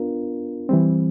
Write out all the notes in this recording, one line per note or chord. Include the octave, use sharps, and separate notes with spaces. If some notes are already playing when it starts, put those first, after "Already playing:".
Already playing: B3 D4 F4 A#4
E3 G3 C4